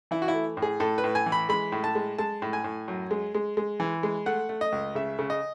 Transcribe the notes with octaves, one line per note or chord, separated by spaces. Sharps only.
E3 E4
F#4
E4
A3
A2
G#4
A2 A4
B4
A2
G#5
E3
B5
G#3 B5
A2
A5
G#3
G#3 A5
A2
G#5
A2
F#2
G#3
G#3
G#3
E3
G#3
A3 F#5
A3
D#5
C#2
C#3 E5
C#3
D#5